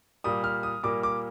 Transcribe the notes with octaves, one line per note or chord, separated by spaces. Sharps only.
A#2 G3 A#3 D#6
F6
D#6
A#2 G3 A#3 D6
D6